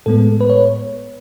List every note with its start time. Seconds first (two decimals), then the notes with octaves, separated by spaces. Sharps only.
0.06 A2 G#3 B3 A4
0.41 B4
0.50 C#5